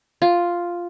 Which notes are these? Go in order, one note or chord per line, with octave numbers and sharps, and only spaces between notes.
F4